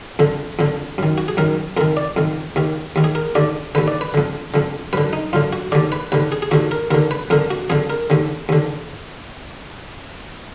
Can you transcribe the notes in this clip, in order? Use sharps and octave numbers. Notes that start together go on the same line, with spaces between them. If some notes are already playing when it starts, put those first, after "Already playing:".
F2 D3
F2 D3
F#2 D#3
F#4
G#4
F#2 D#3 A#4
F2 D#3 A#4
D5
F2 D#3
D#2 D#3
D#2 D#3
G#4
A#4
D#2 D3 D5
D#2 D3 B4
D5
B4
F2 D3
F2 D3
F#2 D3 B4
D#4
F#2 D3 F4
F#4
D#2 D3 D5
B4
D#2 D3 B4
G#4
G#4
D#2 D3 F#4
A#4
D#2 D3 A#4
B4
F2 D3 A#4
F#4
F2 D3 G#4
A#4
D#2 D3
D#2 D3